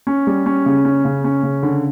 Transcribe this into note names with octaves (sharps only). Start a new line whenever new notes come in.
C#4
G3
C#4
C#3
C#4
C#3
C#4
C#3
D3